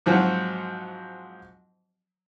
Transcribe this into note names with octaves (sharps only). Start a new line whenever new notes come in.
G#2 F3 F#3 C4 F#4